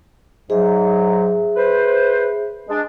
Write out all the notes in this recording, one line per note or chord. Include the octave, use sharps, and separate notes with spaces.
G#2 F#3 G#4 E5
B4 C5
G#3 D4